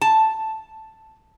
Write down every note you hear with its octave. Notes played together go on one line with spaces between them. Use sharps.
A5